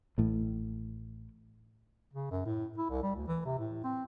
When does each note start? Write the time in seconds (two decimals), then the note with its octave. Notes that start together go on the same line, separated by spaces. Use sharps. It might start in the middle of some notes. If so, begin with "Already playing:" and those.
0.18 A1 A2
2.13 C#3
2.31 F#2
2.45 A2
2.77 E4
2.90 C2
3.02 G3
3.16 D2
3.28 E3
3.45 C3
3.59 A2
3.83 C4